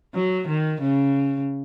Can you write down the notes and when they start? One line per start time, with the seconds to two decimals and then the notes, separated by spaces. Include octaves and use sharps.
0.15 F#3
0.48 D#3
0.81 C#3